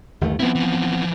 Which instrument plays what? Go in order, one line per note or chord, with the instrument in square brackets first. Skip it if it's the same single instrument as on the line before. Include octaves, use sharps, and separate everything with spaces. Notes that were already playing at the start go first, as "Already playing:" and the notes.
[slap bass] G1 D#2 A3
[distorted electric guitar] F3 E4 [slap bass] B3 C4
[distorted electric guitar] E3 F3